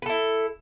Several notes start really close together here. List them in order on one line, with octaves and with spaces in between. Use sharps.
B4 A4 E4